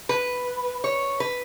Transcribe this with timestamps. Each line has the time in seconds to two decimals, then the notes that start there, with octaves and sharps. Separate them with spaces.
0.09 B4
0.84 C#5
1.20 B4